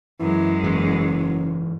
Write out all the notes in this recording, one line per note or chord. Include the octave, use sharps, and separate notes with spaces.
F#2 E3 G#3
F#1 G#2 E3